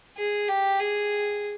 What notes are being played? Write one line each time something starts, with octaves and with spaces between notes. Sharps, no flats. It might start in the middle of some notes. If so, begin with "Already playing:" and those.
G#4
G4
G#4